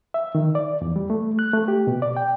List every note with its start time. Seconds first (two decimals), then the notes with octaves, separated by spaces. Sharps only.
0.14 E5
0.35 D#3
0.55 D5
0.82 E2
0.96 G3
1.10 A3
1.39 F#6
1.53 A3
1.68 G4
1.87 B2
2.02 D5
2.17 G5